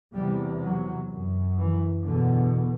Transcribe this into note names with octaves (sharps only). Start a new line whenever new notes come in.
E2 C3 G3
F#3
F#2
E3
E2 B2 D3